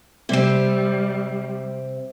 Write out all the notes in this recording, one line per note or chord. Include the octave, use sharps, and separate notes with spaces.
C3 G3 C4